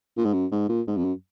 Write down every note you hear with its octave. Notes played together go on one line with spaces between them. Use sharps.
A#2
G#2
F#2
G#2
A#2
G#2
F2
F#2